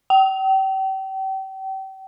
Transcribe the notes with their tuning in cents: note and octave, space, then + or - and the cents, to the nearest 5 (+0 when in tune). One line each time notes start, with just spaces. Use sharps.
G5 -35